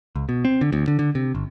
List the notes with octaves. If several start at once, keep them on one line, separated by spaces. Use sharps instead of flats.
C#2
B2
C4
D3
D2
D3
D3
C3
G1